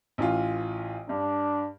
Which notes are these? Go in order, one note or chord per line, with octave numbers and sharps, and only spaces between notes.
A1 E3 F4
G2 D4